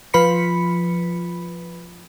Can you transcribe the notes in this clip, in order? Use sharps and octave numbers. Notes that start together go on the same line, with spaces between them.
F3 F4 B4 B5 B6 C#7